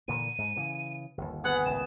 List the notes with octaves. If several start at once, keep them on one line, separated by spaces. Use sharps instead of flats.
A#2 D3 E3 D#7
G#2
C#3 E3
G1 D#2
B3 G#4 F#5
G#1 C#2 A2 E7